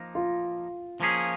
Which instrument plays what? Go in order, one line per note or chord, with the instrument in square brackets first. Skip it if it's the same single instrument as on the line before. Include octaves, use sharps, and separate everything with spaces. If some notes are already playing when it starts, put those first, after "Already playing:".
Already playing: [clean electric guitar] F3 A#3 D#4
[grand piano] F4
[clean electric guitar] F3 A#3 C#4 G#4